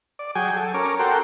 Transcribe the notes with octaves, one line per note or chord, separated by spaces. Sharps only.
D5
F#3 G#4 G5 G#5
A4
C#4 A#4 D6
F#4 A4 A#4 G5 C6